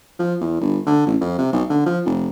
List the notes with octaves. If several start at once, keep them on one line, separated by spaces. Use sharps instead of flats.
F3
E2
G1
D3
A1
F2
C3
B1
D3
F3
F1